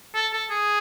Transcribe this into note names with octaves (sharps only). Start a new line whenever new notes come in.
A4
A4
G#4